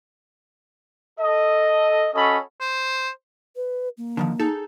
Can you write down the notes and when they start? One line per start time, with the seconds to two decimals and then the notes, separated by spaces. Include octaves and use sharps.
1.19 A4 D#5
2.14 C#4 F#4 A4 D#5 B5
2.61 C5
3.56 B4
3.98 A#3
4.17 D3 D#3 F3
4.40 D#4 G#4 A4